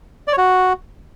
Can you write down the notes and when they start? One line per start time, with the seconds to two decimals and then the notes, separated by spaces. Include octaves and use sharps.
0.28 D5
0.33 C#5
0.38 F#4